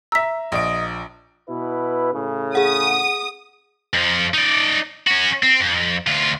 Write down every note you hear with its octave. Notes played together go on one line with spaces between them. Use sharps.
E5 A#5 E6 B6
A#1 D#5 D7
B2 E4 B4
A2 C#3
G#4 F#5 D#6
F2 F3
D#4 D5
C#4 F#4
C4
F2
D2 F4